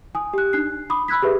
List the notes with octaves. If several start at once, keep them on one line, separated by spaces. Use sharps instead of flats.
G#5 D#6
G4 F#6
D4 D#4 F#6 C7
B5 D6 D#6
B5 E6 F#6 G#6 B6
G4 G#4 B4 E5